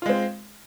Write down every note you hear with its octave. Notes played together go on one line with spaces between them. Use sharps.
G#3 C4 F4